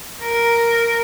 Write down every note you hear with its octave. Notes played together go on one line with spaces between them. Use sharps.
A#4